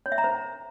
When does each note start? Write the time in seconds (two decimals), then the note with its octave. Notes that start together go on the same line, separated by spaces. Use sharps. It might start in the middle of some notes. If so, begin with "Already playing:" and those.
0.06 C#5
0.12 E5
0.18 A#5
0.24 C5